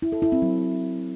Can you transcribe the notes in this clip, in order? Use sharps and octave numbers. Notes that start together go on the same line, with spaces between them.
E4
A4
E4
C4
F#3